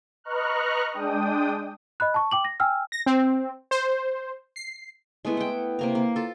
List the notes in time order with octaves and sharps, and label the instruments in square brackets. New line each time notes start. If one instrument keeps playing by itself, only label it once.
[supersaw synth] B4 D#5 A#5 C#6 F6 F#6
G#3 D4 G5 D#6
[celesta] D#5 B5 F#6
A5 C#6
G5 D6 F#7
A#6
G5 G#5 E6 F6
[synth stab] A#6
C4
C5
C7
[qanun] G#3 A3 B3 E4
F#5 G5
C3 A#3 A#5
A#3
F4 A4